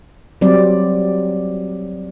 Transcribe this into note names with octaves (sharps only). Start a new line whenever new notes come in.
F#3 G3 C4 D5